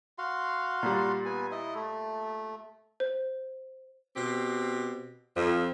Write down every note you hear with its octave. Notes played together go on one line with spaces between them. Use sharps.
F#4 F5 C6
A#2 G3
B3 G#5
E4 D#5
A3
C5
B2 C4 G4
F2